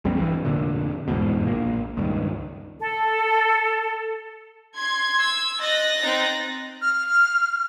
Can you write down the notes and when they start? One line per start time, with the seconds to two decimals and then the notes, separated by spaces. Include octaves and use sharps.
0.05 A#1 E2 G3 C4
0.17 G2 E3
0.45 F1 A#2 D3
1.08 G1 E2 G#2 B2
1.47 A#1 A#2 A#3
1.97 C#2 G2 D#3
2.80 A4
4.77 C6 G#6
5.20 E6
5.61 D#5 F#6 A6 A#6
6.02 C4 D#4
6.82 F6